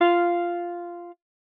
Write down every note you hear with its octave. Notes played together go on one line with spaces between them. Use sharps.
F4 F5